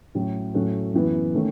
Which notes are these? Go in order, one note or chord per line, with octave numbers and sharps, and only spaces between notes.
A2 F#3 C#4
A2 F#3 A3 C#4 F#4
F#2 E3 B3
D#3 A3 C#4